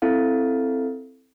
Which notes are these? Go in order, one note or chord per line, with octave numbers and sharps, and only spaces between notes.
C4 E4 A4 F5